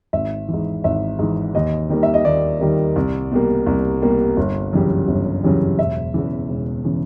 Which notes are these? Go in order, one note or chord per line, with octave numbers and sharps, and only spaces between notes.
G#1 E5
G#2 E3
G#1 E5
G#2 E3
D#2 D#5
D#3 G3 A#3
E5
D#5
D#2 D5
D#3 G3 A#3
C2
B2 G3 A#3
C2
B2 G3 A#3
G1
F#2 C#3 E3 G3
G1
F#2 C#3 E3 G3
E1 E5
E2 C#3 E3
E1
C#3 E3